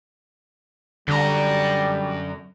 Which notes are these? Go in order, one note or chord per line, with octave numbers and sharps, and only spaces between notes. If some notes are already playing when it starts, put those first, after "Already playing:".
F#2 D3 G3 A#5